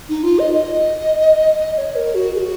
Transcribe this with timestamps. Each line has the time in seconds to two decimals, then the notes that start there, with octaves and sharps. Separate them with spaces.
0.09 D#4
0.23 F4
0.39 D#5
0.54 D#5
1.74 D#5
1.78 C#5
1.95 A#4
2.15 F#4
2.35 G#4
2.39 F#4